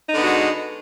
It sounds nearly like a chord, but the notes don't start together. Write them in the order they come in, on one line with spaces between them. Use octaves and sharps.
D#4 D3 B3 F#4 G#3